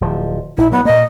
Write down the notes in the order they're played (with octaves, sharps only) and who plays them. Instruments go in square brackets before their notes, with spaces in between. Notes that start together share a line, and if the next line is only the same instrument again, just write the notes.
[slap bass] D1 F3
[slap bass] A#1 [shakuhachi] E4
[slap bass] F#3 [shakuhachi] B3
[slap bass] A#2 A#3 [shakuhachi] D#5